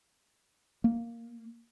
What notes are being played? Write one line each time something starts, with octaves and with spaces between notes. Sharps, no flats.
A#3